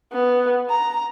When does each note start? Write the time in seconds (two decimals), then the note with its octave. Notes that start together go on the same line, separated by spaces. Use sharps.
0.13 B3
0.70 A#5